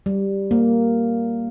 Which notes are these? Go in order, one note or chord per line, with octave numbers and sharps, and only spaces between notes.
G3
A#3